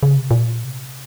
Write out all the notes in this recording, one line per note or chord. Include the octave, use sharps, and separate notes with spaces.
C#3
C3
A#2
C3